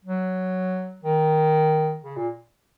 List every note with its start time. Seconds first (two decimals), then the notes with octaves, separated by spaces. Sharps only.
0.05 F#3
1.04 D#3
2.04 C#3
2.16 A#2